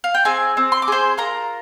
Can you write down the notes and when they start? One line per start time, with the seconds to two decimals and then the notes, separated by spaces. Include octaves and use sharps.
0.04 F5
0.14 G5
0.25 C4 G#4 G#5
0.57 C4
0.72 C6
0.82 D6
0.88 G#4 C5 C6
1.18 F4 A#4 A#5